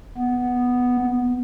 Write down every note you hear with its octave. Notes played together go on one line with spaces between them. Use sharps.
B3